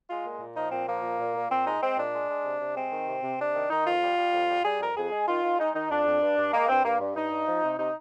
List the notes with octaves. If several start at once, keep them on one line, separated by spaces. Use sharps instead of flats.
G#3 F4
A#2
A#2
F3 D#4
A#2 C4
F3 A#3
A#2
A#2
A#2
A#2 C4
G#3 D#4
G#3 C4
A#2 D4
G#3
G#3
C3
C3
G#3 C4
D#3
C3
C3
C3 D4
D#3
D#3 D#4
F2 F4
G3
G3
F2
G3
G3 G#4
F2 A#4
F2 G#4
G#3
D#3 F4
D#3
G#3 D#4
D#3 D#4
F2 D4
F2
G2
G2
G#3 A#3
G2 C4
G2 A#3
G2
G2 D#4
G2
F3
C3
C3 D#4